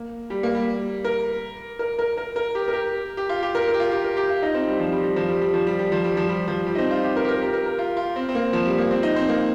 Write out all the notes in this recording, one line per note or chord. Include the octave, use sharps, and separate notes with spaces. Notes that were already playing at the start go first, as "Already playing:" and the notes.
Already playing: A#3
G3
A#3
G3
A#4
A#4
A#4
A#4
A#4
G4
A#4
G4
G4
F4
G4
A#4
A#4
G4
F4
G4
A#4
G4
F4
D#4
C4
G3
F3
G3
G3
F3
G3
G3
F3
G3
G3
F3
G3
F3
G3
F3
G3
D#4
C4
F4
G4
A#4
G4
A#4
G4
A#4
A#4
F4
F4
C4
C4
A#3
F3
G3
A#3
C4
D#4
C4
A#3